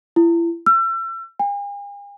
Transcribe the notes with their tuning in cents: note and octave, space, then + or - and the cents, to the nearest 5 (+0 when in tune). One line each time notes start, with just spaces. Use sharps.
E4 +35
E6 +35
G#5 -45